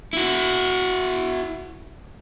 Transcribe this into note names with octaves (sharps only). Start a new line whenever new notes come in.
E4 F#4